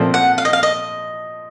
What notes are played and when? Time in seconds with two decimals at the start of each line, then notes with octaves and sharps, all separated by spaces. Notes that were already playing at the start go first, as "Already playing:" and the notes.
Already playing: A#2 F3 A3 C4
0.14 F#5
0.38 F5
0.45 D#5
0.53 F5
0.63 D#5